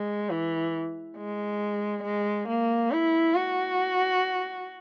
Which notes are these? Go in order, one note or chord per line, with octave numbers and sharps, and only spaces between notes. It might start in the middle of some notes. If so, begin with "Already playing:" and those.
Already playing: G#3
E3
G#3
G#3
A#3
E4
F#4